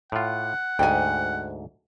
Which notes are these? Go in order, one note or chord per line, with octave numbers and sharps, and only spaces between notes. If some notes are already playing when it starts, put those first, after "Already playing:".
A2 F4 F#5
D2 G#2 G5 G#5